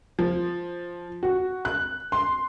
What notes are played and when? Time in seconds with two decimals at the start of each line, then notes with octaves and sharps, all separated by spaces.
0.19 F3
1.23 F#4
1.65 F#6
2.12 C6